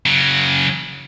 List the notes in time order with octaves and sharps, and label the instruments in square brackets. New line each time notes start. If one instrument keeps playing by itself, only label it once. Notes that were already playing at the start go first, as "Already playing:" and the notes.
[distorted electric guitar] C#3 F#3